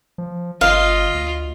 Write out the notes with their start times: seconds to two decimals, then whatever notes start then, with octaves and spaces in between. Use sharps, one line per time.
0.18 F3
0.61 G1 F4 D#5 F5
1.14 D2